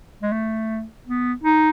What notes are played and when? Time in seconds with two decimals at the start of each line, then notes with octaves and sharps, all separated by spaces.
0.23 G#3
0.32 A3
1.07 B3
1.44 D#4